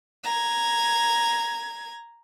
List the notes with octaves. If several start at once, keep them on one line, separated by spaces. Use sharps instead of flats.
A#5 G#6